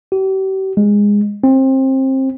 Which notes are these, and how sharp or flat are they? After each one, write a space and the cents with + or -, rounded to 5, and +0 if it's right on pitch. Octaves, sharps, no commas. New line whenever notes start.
G4 -40
G#3 -15
C4 +25